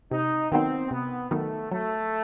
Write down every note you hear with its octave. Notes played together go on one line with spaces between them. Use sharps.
C3 D#4
D#3 F#3 B3 C4 D#4
C3 B3
D#3 F#3 A3 B3 D#4
F#3 A3